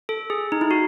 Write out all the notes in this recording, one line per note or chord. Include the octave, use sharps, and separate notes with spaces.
A4
G#4
D#4
E4
F#4